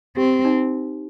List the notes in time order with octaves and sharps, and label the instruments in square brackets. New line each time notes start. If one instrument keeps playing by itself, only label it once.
[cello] C4 [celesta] G4
[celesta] D#4